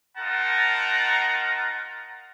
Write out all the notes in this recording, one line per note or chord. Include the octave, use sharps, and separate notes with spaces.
D#4 F4 A#4 F#5 A5 A#5